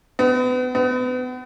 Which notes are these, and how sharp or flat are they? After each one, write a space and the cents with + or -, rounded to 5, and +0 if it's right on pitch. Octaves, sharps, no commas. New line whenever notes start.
B3 +35
B3 +35